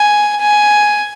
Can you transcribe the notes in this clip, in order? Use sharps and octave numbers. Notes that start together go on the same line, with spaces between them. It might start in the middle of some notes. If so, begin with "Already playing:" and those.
Already playing: G#5
G#5